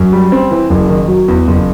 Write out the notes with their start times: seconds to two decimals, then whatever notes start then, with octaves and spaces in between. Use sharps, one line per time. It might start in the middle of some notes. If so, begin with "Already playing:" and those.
Already playing: F#2
0.12 G3
0.32 C4
0.51 E3
0.70 F#1
0.89 D#3
1.08 F#3
1.28 E2
1.47 F#1